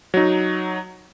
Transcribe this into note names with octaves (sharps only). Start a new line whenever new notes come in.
F#3 D#4